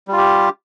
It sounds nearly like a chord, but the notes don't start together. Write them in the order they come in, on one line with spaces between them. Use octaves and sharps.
G3 F4 G4